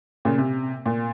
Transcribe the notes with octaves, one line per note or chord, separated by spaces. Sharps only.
A#2 C#3
C3
A#2